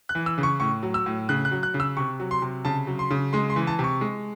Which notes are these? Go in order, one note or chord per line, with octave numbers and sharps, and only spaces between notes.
F#6
E3
E6
C#3
C#6
A2 C#6
F#3
E6
A2
C#3 F#6
F#6
F#3
F#6
C#3
E6
C3 C#6
F#3
C6
C3
C#3 A5
F#3
C6
C#3
G#3 C6
C6
E3
A5
C3
C#6
G#3